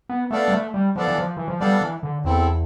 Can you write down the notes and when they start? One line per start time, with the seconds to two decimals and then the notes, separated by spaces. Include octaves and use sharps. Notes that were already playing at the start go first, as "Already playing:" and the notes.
0.09 B3
0.31 A3 B3 D4 A4 D5 F5
0.48 G3
0.52 A3
0.74 G3
0.96 F3 B3 D4 A4 D5 F5
1.08 E3
1.18 F3
1.37 E3
1.48 F3
1.60 G3 B3 D4 A4 D5 F5
1.81 E3
2.03 D3
2.24 E2 C4 E4 A4